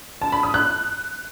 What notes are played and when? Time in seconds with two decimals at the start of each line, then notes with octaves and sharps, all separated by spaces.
0.22 A5
0.32 B5
0.43 D#6
0.54 F#6